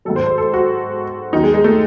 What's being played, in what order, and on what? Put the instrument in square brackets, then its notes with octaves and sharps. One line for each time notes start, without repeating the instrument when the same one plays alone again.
[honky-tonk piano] G#2 D#3 F#3 A4
C5
C5
A4
F#4
D#2 D#3 F#3 D#4
G#3
G#3
A3